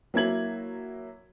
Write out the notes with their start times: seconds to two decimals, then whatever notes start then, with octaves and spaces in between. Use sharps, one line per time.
0.14 F#3 A#3 E4 G#6 F#7